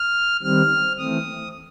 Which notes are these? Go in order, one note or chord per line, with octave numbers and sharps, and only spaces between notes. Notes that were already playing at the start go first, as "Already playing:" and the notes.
Already playing: F6
D#3 G3 C4 F6
E3 A3 C4 D#6